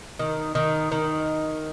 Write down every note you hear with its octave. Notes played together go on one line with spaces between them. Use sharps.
D#3
D#3
D#3